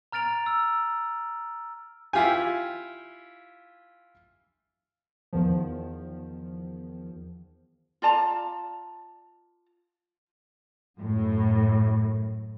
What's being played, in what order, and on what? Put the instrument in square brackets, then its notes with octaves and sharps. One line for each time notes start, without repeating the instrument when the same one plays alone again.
[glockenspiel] A#5 F6 A6 D7 F7
E6
[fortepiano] E4 F4 G4 G#5
[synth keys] E2 D#3 F3
[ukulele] F4 D5 A5 A#5
[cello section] F#2 A2